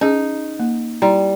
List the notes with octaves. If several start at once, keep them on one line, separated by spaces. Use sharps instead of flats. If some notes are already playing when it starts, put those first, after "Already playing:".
C#4 D#4 G#4
A#3
G3 E4 A#5